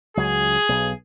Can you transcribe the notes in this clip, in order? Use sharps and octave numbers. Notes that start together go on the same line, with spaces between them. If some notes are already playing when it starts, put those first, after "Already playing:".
C#2 F#3 G#4
B1